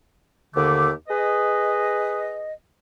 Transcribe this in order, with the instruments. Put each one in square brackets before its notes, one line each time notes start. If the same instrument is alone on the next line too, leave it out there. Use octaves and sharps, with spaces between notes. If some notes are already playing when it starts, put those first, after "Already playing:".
[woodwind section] D#2 D3 A3 D6
G#4 B4 D#5